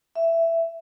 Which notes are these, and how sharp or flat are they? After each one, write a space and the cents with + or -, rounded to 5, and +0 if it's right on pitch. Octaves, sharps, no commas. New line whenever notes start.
E5 +10